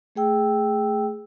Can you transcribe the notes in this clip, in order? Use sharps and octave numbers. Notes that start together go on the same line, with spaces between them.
A3 G#4 G5 E6